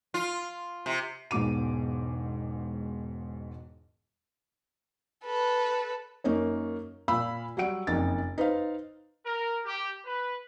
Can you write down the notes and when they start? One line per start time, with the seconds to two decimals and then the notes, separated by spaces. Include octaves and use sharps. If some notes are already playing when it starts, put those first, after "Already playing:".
0.14 F4
0.86 C3
1.31 E1 G#2 B2 D6 D#7
5.24 A4 B4
6.24 F#2 A#3 D#4 C#5
7.08 A#2 F5 B5 E6
7.57 F#3 G3 F#5 D7
7.87 F#1 F2 D#4 A6
8.38 D#4 B4 C5 F5
9.25 A#4
9.65 G4
10.05 B4